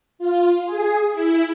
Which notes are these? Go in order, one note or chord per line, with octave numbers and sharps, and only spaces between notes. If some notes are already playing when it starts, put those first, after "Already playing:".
F4
G#4
E4